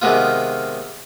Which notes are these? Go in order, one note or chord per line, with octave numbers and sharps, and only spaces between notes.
C3 D#3 G#3 B3 F4